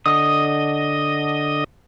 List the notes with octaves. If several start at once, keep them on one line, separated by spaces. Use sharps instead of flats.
D3 D#5 D#6